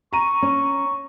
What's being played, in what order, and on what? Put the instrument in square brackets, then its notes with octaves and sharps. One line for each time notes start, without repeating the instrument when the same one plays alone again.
[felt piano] A#5 D#7 [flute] C#6
[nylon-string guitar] C#4